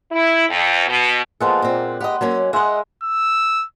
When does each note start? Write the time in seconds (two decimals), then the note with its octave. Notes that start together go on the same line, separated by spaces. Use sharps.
0.12 E4
0.50 F2
0.88 B2
1.40 F3 G#3 A#3 B3 A4 F#5
1.62 A#2 C4
2.00 G4 D#5 F#5 B5
2.21 F#3 A#3 C#4
2.53 G#3 D#5 E5 F#5 G5
3.04 E6